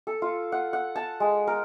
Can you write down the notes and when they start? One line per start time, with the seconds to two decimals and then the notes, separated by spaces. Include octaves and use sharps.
0.07 A4
0.22 F4
0.52 F#5
0.73 F#5
0.96 A5
1.20 G#3
1.47 A#4